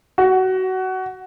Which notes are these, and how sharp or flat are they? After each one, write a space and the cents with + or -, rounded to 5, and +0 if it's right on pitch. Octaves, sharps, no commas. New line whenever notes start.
F#4 +20